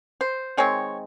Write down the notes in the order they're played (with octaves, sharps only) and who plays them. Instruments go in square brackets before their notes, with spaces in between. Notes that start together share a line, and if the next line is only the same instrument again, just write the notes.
[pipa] C5
D#3 G#3 C4 C#5